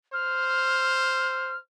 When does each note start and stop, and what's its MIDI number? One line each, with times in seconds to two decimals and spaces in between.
0.13 1.59 72
0.13 1.57 89